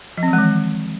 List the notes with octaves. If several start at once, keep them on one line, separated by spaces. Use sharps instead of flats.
F3
C4
E3
G#3
D#3